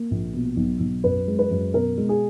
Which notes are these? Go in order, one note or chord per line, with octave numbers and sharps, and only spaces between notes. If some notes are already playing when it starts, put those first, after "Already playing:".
Already playing: A#3
A#1
B2
B1
B1
F#2 B4
G#3
B4
F#2
B2 A#4
G#3
G#4